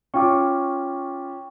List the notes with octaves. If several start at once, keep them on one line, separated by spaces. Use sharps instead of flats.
C#4 F4 G5 C#6 D6